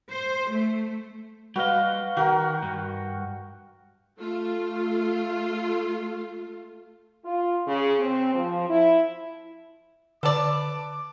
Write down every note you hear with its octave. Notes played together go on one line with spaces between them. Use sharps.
C5
A3
G3 F#4 B4 D#5 F5
D#3 F#4 A#4 G5
G2
A3 F4
F4
C#3
C4
F3
E4
D3 A4 B4 D5 A5 D6